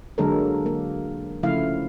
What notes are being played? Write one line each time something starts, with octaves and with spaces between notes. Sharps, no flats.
D3 F#3 G#3 A#3 A4 A#4
A#3
C#3 F3 A3 E4 F5